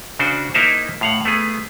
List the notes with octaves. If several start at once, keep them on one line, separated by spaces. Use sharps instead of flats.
C#3 D4 F#4 C5
A#3 D#4 E4 A#4 C5 A5
A2 F5 F#5
A3 B3 G#4